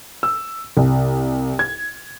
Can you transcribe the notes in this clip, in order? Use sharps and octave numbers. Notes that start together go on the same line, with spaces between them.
E6
C2
G#6